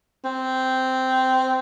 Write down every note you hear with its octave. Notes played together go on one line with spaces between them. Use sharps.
C4